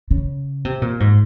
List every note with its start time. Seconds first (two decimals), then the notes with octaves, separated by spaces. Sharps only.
0.11 C#3
0.65 C3
0.82 A#2
1.00 G#2